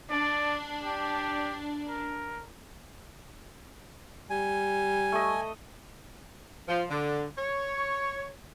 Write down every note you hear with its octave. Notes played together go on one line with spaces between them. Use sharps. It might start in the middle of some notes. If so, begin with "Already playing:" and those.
D4 D5
G4
A#4
G3 G#5
A3 D#5
F3
D3
C#5